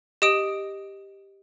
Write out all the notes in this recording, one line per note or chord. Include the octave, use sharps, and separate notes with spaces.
G4 D#5 D#6 D7